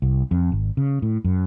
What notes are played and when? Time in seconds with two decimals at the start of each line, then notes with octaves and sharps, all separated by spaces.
0.02 C2
0.31 F2
0.52 G#1
0.77 C#3
1.02 A2
1.24 F#2